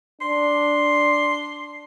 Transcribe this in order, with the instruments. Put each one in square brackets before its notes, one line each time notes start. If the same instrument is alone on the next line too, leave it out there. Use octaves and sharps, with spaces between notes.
[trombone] D4 [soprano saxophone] C6